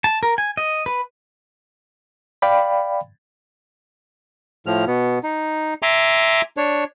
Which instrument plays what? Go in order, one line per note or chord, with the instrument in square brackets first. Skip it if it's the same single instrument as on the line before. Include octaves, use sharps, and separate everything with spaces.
[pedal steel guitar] A5
A#4
G#5
D#5
B4
[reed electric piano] D5 F5 G5 B5
[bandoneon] A2 F3 F6
B2 B3
D#4
E5 G#5 A#5 C6 D6
D4 C#5